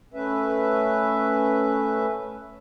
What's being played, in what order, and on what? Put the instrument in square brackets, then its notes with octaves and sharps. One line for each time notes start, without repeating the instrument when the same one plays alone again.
[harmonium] A3 C#4 B4 E5